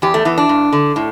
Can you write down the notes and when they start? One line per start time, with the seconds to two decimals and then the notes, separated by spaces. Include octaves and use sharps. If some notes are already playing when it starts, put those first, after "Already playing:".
0.02 E2 G4
0.14 A3
0.25 E3 B3
0.38 D4
0.49 G2
0.73 D3
0.96 A2